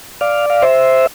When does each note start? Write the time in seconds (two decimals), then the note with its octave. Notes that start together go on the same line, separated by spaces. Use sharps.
0.21 D5 F5
0.50 F5
0.62 C5 E5